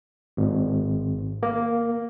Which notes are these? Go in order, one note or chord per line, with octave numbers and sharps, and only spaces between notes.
G#1
A#3